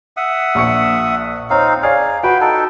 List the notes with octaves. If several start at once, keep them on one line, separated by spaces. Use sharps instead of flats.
E5 F#5 D#6
A#1 C#6 C#7
C4 D#4 C#5 F5
G#4 C#5 D5 F5
F#4 B4 G5
D#4 A4 G5